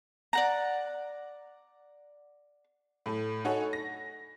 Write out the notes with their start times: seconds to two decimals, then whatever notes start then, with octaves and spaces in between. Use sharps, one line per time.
0.33 D5 F#5 A#5
3.06 A2 A3
3.45 D#4 F#4 A4 C#5 G#5
3.73 A#6